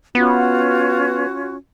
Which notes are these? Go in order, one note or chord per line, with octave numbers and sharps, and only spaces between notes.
B3 C#4 F4 F#4